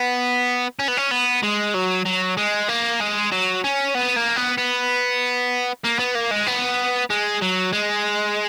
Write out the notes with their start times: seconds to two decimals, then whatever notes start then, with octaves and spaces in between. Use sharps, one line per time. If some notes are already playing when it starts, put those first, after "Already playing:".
Already playing: B3
0.79 C#4
0.88 B3
0.97 C#4
1.11 B3
1.43 G#3
1.75 F#3
2.06 F#3
2.38 G#3
2.69 A#3
3.01 G#3
3.32 F#3
3.64 C#4
3.95 B3
4.17 A#3
4.37 B3
4.58 B3
5.85 A#3
5.99 B3
6.15 A#3
6.31 G#3
6.47 B3
7.10 G#3
7.42 F#3
7.73 G#3